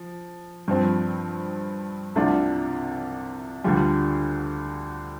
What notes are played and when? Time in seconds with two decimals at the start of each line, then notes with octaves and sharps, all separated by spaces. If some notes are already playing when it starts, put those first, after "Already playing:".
Already playing: F3
0.68 G2 F3 C4
2.15 C2 C3 A3 D4 F4
3.64 D2 D3 G3 F4